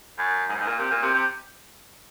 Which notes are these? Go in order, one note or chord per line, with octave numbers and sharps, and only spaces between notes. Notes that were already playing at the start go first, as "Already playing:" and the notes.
F#2
G#2
F#2
G#2
A#2
C3
A#2
C3
C3